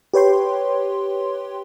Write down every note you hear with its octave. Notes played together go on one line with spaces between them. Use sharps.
G4 B4 C#5 G5 C6